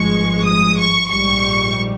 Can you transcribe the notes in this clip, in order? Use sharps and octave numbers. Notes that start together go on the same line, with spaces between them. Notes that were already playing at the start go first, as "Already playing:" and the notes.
Already playing: G#1 G2 F3 G#3 C#6
D#6
C#6
A#1 G#2 G3 C#6